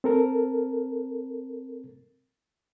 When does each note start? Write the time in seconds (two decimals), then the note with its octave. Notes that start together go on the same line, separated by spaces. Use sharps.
0.04 C4 A4 A#4